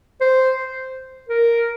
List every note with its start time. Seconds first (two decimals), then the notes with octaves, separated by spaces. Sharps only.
0.21 C5
1.29 A#4